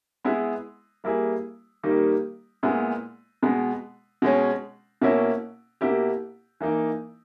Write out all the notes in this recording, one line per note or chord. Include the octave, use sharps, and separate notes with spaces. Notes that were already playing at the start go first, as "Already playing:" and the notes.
G#3 B3 E4 G#4
G3 A#3 E4 G#4
D#3 G3 A#3 D#4 G4
A#2 G#3 B3 E4 G#4
B2 G#3 B3
B2 G#3 C#4
B2 A#3 C#4 E4
B2 A#3 E4 G4
E3 A#3 D#4